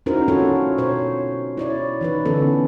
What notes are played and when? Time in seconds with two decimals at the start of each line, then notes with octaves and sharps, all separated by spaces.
0.06 C#4 D#4 E4 F#4 A#4 C5
0.28 D4 F4 F#4 A4 C#5
0.78 B2 C5 C#5
1.57 E4 C#5 D5
2.01 E3 D#4 B4
2.25 D3 E3 B3 C#4 A4